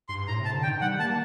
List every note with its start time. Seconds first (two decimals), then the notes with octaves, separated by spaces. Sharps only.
0.09 G2 C6
0.28 A2 A#5
0.40 C3 A5
0.54 D3
0.63 G5
0.68 D#3
0.81 G3 F#5
0.99 A#3 A5